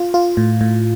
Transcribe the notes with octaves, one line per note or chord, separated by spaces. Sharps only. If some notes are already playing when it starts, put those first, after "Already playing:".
Already playing: F4
F4
A2
A2